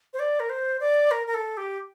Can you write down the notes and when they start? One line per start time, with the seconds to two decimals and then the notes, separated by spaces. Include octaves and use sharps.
0.14 C5
0.19 D5
0.40 A#4
0.50 C5
0.80 D5
1.11 A#4
1.27 A#4
1.34 A4
1.57 G4